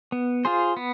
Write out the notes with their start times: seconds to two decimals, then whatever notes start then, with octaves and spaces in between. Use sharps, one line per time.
0.12 B3
0.45 F4 G#4 C5
0.77 B3